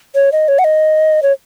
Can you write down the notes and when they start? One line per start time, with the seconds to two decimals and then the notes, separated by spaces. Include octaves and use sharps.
0.15 C#5
0.32 D#5
0.48 C#5
0.59 F#5
0.64 D#5
1.23 C#5